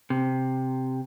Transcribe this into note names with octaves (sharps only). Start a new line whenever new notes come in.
C3